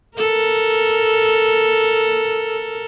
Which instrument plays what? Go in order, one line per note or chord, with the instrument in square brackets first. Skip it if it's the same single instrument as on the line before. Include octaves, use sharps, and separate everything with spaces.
[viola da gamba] A4 A#4